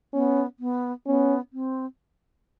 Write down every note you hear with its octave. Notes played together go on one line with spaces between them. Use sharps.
B3 C#4
B3
B3 C#4
C4